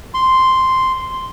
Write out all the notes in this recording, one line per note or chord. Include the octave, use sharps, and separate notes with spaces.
C6